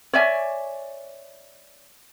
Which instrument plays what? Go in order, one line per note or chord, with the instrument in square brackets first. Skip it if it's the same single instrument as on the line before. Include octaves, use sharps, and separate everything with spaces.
[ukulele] C#5 D5 E5 G#5